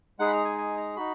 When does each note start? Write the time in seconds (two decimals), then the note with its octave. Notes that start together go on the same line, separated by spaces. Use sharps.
0.19 G#3 D#4 G#4 F#5
0.27 B5
0.33 A#5
0.45 G#5
0.58 G#5
0.77 A#5
0.96 D#4 F#4 B5